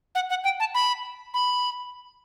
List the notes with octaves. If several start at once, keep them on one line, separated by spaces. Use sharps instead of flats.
F#5
F#5
G5
A5
B5
B5